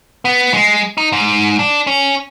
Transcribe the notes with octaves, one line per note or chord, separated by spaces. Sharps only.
B3
G#3
D#4
G#2
D4
C#4